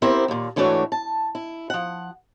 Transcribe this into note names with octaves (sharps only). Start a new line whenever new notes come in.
B3 C4 E4 G4 A#4 C5
D#2 A#2
G#2 E3 A3 D4 F#4 C#5
A5
E4
F3 F#5